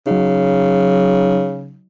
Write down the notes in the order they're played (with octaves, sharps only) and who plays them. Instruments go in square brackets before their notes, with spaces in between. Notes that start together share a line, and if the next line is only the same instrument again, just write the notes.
[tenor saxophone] C#3 [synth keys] F#3 D#4